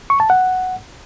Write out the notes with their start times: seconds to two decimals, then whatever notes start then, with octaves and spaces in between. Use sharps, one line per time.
0.10 C#6
0.20 A5
0.30 F#5